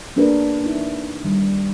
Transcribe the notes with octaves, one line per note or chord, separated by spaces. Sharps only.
A#3 D4 G#4 A#4 B4
D#4 E4
D#3 G3